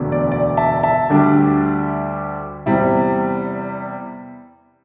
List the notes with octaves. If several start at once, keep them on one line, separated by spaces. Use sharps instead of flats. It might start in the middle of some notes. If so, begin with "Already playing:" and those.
Already playing: E1 D2 D3
D5
D5
E5 A5
E5 A5
D2 D3 G3 D4
E2 C3 G3 E4